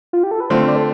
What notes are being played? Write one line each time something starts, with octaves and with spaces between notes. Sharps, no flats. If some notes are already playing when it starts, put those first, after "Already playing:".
F4
G4
A4
B4
D3 A3 C4 F4 C5
D5
A4